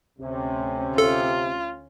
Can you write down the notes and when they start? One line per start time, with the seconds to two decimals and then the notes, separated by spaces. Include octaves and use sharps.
0.19 D2 C3 C#4
0.98 F4 A4